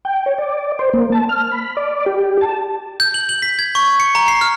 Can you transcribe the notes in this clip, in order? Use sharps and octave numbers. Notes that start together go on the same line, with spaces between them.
G5
C#5
D5
C5
A#3
A5
F6
B5
D5
G4
A5
G6
F#7
F#7
B6
G#6
C#6
C#7
A#5
C7
F6